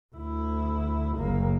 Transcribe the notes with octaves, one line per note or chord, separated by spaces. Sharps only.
D2 E4
F#1 A#3